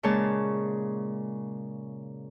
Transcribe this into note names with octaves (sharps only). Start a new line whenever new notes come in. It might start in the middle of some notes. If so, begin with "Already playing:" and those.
A#2 C#3 G#3 C#5 A5